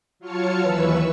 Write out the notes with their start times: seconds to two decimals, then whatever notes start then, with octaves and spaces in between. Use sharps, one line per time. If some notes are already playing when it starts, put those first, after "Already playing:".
0.19 F#3 F4 C#5 F5 A5 C#7
0.61 D#2 E3 B4 C#6 E6